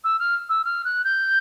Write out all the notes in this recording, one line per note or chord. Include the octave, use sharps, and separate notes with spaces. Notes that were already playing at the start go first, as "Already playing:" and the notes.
E6
F6
E6
F6
F#6
G6